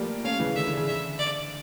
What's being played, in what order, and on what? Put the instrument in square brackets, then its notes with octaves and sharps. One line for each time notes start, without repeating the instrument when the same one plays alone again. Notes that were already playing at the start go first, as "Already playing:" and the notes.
Already playing: [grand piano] F3 G3 A3 A#3
[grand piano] A3 C#4 [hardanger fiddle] F5
[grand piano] C#3 E3
[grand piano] D3 [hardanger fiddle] E5
[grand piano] D3
C#3
[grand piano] D3 [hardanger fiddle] E5
[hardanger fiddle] D5